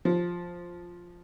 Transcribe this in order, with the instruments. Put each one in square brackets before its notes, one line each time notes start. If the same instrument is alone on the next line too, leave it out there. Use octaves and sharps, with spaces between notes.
[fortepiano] F3